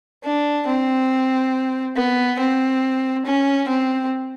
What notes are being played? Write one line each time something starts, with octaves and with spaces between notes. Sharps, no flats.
D4
C4
B3
C4
C#4
C4